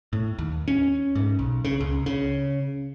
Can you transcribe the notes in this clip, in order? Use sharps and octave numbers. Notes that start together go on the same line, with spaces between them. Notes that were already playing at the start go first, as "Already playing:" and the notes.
A2
D#2
C#4
G#2
B1
C#3
C#2
C#3